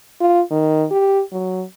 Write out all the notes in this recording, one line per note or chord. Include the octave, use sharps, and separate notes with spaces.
F4
D#3
G4
F#3